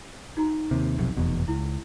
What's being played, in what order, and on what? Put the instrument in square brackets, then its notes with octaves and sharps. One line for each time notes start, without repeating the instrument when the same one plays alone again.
[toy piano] D#4 F#4 A#5
[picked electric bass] D#2 C3
B1 F2 C3
F1 E2 B2
[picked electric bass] C#2 [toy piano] E4